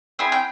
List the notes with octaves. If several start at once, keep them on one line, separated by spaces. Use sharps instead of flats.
C4 E4 G#4 G#5
G5